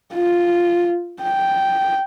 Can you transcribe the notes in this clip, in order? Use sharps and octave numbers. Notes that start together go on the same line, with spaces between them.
F4
G5